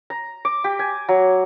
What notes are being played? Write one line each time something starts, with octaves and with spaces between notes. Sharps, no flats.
A#5
D6
G4
G#5
F#3